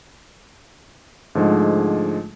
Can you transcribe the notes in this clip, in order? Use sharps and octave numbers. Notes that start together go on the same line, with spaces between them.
G#2 D3 F3 G#3 A3